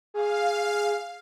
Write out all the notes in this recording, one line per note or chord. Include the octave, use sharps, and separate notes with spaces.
G#4 F5